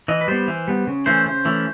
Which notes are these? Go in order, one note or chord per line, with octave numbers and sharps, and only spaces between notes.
E3 D#5
B4
G3 B3 C5
E3
G3 B3
C#3
E3 A3 C#4 C5
C#3 C5
E3 A3 C#4